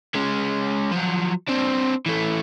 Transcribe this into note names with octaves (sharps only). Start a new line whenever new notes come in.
G#3 C#4
F3 F#3
C4 D4
E3 A3